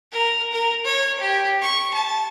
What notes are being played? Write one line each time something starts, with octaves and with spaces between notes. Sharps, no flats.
A#4
A#4
C#5
G4
C#6
A5